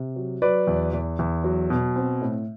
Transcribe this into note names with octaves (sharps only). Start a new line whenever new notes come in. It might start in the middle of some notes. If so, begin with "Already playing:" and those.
Already playing: C3
F#3
F#3 B4 D5
E2
E2
E2
F#3
B2
C4
A2